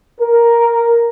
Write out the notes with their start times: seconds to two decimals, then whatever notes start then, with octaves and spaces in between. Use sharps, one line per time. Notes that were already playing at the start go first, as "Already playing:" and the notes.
0.21 A#4